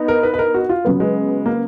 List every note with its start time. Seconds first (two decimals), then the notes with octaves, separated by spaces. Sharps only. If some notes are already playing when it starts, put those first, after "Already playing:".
Already playing: B3 D#4
0.08 A#4
0.23 B4
0.34 B4
0.39 A#4
0.54 F#4
0.69 F4
0.85 C#3 F#3 B3
1.00 G#3
1.46 A#3